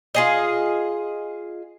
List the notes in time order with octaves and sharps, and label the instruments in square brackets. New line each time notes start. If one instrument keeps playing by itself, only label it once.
[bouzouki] F4 G#4 D#5